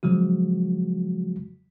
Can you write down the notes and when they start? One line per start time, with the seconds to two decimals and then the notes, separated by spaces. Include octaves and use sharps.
0.03 C#3 F3 F#3 G#3 F#4